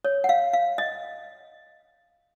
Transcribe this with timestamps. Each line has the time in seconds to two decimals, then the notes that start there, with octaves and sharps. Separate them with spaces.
0.05 C#5
0.24 F#5
0.29 F5
0.54 F5
0.78 D#5